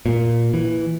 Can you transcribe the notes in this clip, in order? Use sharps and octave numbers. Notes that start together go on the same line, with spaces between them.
A#2
E3